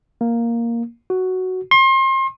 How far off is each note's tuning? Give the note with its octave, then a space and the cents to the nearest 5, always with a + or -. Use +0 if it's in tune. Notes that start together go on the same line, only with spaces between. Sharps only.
A#3 +0
F#4 +5
C6 +35